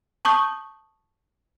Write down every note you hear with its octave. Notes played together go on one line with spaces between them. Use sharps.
A5 C#6 D#6 G6